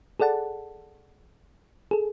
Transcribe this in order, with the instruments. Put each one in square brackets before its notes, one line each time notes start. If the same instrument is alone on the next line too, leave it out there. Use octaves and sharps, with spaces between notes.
[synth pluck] G#4 A4 D5 F#5 A5
G#4 A4